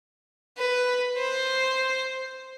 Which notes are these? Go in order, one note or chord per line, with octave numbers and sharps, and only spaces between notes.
B4
C5